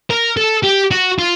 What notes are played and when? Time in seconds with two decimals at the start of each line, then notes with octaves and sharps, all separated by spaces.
0.10 A#4
0.37 A4
0.64 G4
0.91 F#4
1.19 F4